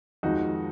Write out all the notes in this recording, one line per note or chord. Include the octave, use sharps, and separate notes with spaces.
F2 D#3 G#3 D#4 F#4